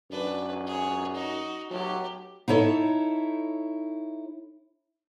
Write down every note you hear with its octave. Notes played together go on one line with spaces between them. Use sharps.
F#2 D4 B4
G#4 C#5
D#4 F#4
F#3 A3 G4
D#4 E4 A4 C#5